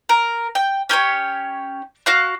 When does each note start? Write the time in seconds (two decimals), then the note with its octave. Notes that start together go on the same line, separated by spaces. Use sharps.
0.09 A#4
0.55 G5
0.89 C#4 G4 A#4 C#5
2.06 F#4 F5 F#6